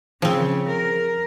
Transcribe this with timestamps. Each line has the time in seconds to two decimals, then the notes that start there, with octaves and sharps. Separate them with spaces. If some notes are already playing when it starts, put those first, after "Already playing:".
0.22 C#3 F3 C4 G#4
0.67 A#4